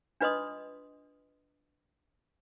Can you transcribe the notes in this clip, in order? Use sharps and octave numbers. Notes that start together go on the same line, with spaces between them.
D4 F4 B4 D#5 C6 D#6